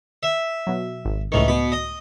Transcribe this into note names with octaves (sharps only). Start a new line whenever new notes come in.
E5
B2 F#3
G#1
C#2 A2 D#3 E3 C#6
B2 B5
D#5